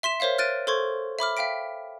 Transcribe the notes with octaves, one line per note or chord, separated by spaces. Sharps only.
E5 C6 B6 E7
A#4 C5 C#5 E5 F5
F6 F#6 A6 D7 D#7
A4 C5 C6 C#6 G#6
E5 B5 D6 F6
E5 F5 G5 B6 D7